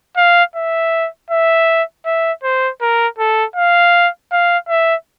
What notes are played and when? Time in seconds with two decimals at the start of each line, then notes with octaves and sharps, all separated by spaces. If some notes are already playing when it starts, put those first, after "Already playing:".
0.17 F5
0.55 E5
1.30 E5
2.06 E5
2.44 C5
2.81 A#4
3.18 A4
3.56 F5
4.32 F5
4.69 E5